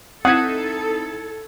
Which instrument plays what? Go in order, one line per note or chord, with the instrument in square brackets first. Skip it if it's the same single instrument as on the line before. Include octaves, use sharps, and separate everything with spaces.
[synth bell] C4 D#4 E4 [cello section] A4 [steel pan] F#5 [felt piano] D#6 G#6